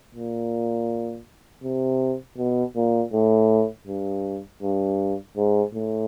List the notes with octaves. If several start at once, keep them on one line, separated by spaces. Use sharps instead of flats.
A#2
C3
B2
A#2
A2
G2
G2
G#2
A2